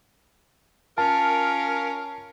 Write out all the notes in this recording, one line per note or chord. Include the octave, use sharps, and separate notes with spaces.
C#4 F4 A#4 A5